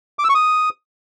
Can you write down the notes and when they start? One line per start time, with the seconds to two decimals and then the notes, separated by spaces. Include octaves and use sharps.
0.19 D6
0.24 E6
0.29 C#6
0.35 D#6